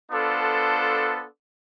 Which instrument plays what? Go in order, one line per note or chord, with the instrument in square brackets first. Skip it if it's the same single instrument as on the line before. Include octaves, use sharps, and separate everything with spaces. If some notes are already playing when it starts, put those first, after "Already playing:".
[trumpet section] B3 D4 F4 A4 C5